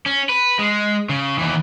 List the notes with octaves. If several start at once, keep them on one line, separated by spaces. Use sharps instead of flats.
C#4
B4
G#3
C#3
D#2 E3